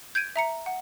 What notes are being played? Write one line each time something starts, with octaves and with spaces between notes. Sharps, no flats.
G6 G#6 D7 D#7
E5 A#5 C#7
F#5